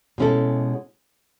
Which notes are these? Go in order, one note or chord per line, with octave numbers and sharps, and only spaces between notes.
B2 G#3 C#4 E4 A4